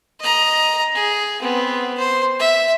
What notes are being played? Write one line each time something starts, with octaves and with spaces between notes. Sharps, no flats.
D#5 A#5
G#4
B3 C4
C5
E5